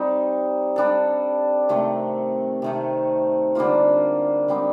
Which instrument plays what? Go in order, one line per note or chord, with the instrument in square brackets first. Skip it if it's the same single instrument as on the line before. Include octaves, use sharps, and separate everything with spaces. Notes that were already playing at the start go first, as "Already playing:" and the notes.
Already playing: [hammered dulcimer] G3 C4 D#4
G3 D4 A4
C3 D#3 A3 C4
C3 D#3 A3
D3 G3 A#3 F4
D3 G3 C4 D#4